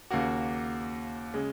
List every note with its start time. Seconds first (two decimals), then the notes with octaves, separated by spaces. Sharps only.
0.10 D#2 C#3 A#3 F#4
1.34 C#3 G#3